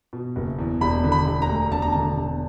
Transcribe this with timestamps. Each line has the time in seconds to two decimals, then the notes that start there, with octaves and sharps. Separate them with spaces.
0.13 B2
0.36 F#1
0.59 E2
0.81 E1 B5
1.04 D3
1.12 B5
1.27 E1
1.42 A#5
1.49 D2
1.72 E1 A5
1.82 A#5
1.92 D3 A5
2.17 E1